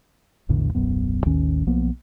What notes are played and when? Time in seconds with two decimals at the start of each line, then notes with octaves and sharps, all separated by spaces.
0.49 A#1 E2 A2 D3
0.75 D#1 B1 F#2 B3
1.26 A1 D#2 D#3 C#4
1.67 B1 F3 A#3 B3